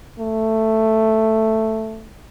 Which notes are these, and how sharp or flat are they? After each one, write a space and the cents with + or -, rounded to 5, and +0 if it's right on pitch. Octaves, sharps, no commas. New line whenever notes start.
A3 +5